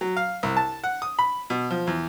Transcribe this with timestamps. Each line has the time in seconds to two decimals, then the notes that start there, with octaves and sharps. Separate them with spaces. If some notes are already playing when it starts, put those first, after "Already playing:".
0.01 F#3
0.17 F5
0.43 C2
0.57 A5
0.84 F#5
1.02 D#6
1.19 B5
1.50 B2
1.70 F3
1.87 E2